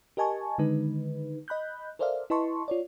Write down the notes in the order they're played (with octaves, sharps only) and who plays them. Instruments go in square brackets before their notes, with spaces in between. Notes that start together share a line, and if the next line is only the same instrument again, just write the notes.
[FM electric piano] G4 A#4 D#5 G#5 A5 C#6
D3 D#3 G#3 D#4 B4
D#5 B5 F#6 G6
A4 A#4 C5 D5 E5 F5
E4 B4 D#5 A5 C6 C#6
F4 C#5 D5